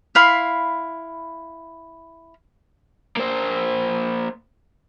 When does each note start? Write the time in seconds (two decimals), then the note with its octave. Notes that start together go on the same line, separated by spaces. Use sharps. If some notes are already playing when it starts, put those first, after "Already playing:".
0.15 E4 F5 B5 C6
3.17 A#3 C5